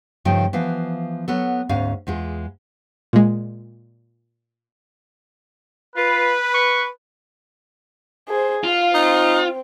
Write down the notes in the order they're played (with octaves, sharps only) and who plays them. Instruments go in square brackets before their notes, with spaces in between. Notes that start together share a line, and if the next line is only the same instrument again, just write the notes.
[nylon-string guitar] G2 C#3 F3 A3 D#4 G5
E3 F3 B3 F5
F#3 B3 A4
D2 G#2 C#4 F5
E2 G#3 F4
[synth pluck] A#2 G#3
[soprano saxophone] F4 [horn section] B4
[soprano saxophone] C#6
[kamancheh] G#4 C5
[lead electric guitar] F4 [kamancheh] F5
[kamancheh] C4 [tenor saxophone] D#4